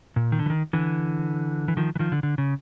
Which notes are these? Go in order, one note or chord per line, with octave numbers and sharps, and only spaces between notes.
A#2
D#3
D3
E3
D#3
D3 E3
E3
D#3 F3
E3
D#3 F3
D3
D3
C#3